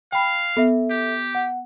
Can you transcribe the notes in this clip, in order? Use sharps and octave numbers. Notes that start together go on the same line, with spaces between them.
F5 G5 B5
B3 A4 E5
G4
F#5